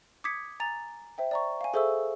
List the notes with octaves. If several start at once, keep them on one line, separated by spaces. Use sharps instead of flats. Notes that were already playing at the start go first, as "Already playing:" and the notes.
D6 D#6 G#6 B6 C#7
G#5 A#5 A6 F7
C5 E5 G5
D5 A#5 C#6
F5 G#5
G#4 A4 C5 E5 C#6 E6